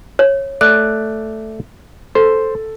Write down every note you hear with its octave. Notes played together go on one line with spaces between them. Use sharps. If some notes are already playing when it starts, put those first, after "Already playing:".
C#5
A3 D5 F#6
A4 C5